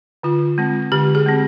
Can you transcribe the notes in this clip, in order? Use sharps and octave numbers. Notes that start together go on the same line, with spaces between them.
D3 F4
G#3 C4
D3 G4
G#4
G#3 C4